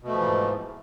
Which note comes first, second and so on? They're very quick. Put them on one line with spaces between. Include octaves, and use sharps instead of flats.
B2 A3 F3 E3 G#2